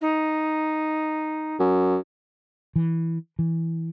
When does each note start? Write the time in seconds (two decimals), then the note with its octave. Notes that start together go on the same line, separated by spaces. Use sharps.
0.01 D#4
1.60 F#2
2.76 E3
3.39 E3